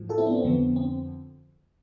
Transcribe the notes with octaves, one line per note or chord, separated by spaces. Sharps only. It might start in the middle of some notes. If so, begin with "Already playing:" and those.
Already playing: A2 F3
F4 A4
C4 E4
B3 D4
C4
F2 D3 F3 B3
C4